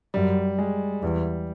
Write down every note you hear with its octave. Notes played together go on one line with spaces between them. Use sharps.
F#2 G3
G#3
E2 G3